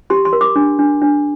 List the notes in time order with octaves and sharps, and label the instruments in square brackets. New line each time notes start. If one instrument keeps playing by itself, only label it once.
[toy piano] G4 C6
C6
A#4
D6
D4
D4
D4